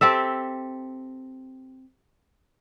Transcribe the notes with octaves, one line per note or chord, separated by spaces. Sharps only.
C4 G4 A4 E5